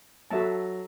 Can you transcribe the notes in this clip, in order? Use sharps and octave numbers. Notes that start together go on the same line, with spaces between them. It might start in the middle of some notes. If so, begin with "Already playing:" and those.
F#3 F#4 A4 E5 A5